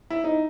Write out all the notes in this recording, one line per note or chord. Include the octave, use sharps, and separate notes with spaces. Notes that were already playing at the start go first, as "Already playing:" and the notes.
E4
D#4